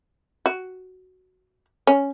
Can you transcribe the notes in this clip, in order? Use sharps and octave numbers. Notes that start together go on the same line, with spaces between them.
F#4
C#4